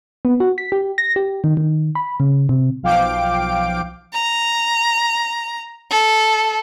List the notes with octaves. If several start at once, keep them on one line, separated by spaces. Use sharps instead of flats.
B3
F#4
B6
G4
A#6
G4
D#3
D#3
B5
C#3
C3
B1 F3 F5 G5 D6 D7
A#5
A4